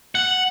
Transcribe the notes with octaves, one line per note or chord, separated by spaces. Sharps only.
F#5